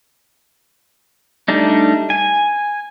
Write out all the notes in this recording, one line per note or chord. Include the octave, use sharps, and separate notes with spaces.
G3 A3 D4 D#4
G#5